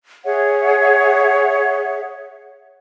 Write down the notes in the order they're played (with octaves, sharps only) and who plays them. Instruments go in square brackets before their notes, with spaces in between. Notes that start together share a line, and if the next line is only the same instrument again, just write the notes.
[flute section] G#4 C#5 E5 F#5